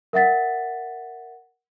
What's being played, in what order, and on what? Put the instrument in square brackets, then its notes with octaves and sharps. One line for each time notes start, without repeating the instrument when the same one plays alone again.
[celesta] A#4 E5 F#5 A6 B6